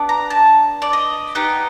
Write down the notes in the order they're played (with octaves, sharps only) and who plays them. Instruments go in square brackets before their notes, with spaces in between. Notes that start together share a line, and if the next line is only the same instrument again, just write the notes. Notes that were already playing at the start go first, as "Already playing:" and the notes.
Already playing: [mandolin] B3 D4 G4
A#5
A5
D5
D#5
B3 D#4 G4